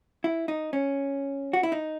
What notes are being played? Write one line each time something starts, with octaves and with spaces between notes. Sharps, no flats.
E4
D#4
C#4
F#4
E4
D#4